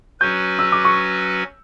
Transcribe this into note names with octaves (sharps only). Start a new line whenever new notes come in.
F#3 C#4 F#4 B4 G6
E6
D6
C#6